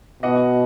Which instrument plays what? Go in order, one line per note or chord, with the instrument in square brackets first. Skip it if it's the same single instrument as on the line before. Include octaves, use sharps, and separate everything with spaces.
[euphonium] B2 [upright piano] D#5 F#5